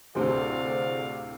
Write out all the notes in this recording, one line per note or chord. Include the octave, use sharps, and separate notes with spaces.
D2 A2 C3 F#4 G#4 C5 D5 F5